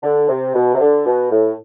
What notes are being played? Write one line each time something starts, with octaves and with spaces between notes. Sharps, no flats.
D3
C3
B2
C3
D3
B2
A2